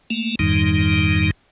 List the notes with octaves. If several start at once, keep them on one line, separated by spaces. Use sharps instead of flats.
A3 A#3
F2 G#2 D#3 G3 D#4